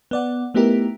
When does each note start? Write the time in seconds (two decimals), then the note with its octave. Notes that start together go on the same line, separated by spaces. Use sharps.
0.11 B3 D5 F#5
0.54 A3 B3 D#4 E4 G4 A#4